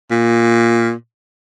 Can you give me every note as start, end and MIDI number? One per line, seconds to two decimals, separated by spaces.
0.11 0.92 46